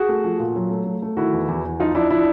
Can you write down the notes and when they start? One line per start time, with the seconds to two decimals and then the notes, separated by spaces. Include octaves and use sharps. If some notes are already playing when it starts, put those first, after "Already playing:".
Already playing: F#4 G#4
0.09 A3
0.24 F3
0.40 A#2
0.56 F#3
0.70 A3
0.86 A3
1.02 A3
1.17 D#3 E4 F#4
1.33 E2
1.48 E2
1.64 E2
1.80 F3 D#4 F4
1.95 F3 D4 E4
2.10 F3 D4 E4